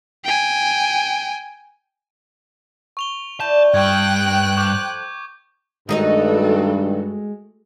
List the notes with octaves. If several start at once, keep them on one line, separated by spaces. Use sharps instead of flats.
G5 G#5
C#6 F7 G7
E4 B4 D5 A5 G6
G2 G5 C#6 F#6 G#6
F3 A4 C#6 D6 G6
G2 D#3 G#3 A3 D#4 F#4 A4 D#5